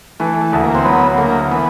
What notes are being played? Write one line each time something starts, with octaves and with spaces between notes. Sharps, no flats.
E3 A3
A3
D2
A#3
C4
F#3 B3
D3 A#3
E3 B3